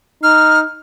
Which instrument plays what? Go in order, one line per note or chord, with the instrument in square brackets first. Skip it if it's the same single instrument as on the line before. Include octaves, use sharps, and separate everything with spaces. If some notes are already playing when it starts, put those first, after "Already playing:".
[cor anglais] D#4 [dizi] F6